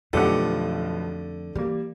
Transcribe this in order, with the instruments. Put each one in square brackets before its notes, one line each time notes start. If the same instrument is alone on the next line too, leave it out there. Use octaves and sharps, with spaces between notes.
[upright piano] B1 F3 B3 [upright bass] F2 [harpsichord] D3 [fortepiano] A3 G4 F#5
[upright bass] E3 [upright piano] G3 A#3